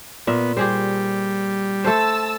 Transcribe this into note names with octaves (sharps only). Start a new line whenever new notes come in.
A#2 B3 E5
G3 G4 G#4 C5
A3 A4 C5 A5 E6